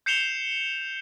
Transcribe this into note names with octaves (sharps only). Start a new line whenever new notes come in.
G6 C7 C#7 E7 F7 G7